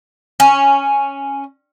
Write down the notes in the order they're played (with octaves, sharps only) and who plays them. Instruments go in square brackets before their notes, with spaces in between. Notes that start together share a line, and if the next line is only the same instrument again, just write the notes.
[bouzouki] C#4